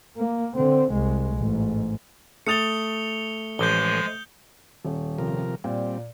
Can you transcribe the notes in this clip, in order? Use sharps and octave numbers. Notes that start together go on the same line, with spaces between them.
A#3
D3 C4
C2 G#3
A1 G#2
A3 D#6 A6 C#7 F7 G7
A1 F3 G#3 G6 G7
D#1
C3 F3 A#4
A#2 G3 C4